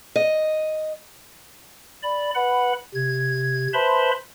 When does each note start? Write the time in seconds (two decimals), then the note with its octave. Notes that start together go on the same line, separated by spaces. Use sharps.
0.16 D#5
2.03 D5 B5
2.35 B4 F#5 B5
2.95 C3 G#6
3.73 B4 C5 E5 A5 B5 C6